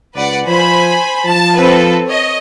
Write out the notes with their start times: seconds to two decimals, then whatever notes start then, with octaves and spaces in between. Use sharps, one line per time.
0.15 C#2 B4 D5 F#5
0.47 F3 C5 G#5 B5
1.25 F3 A5
1.56 C4 A4 B4
2.06 C#5 D#5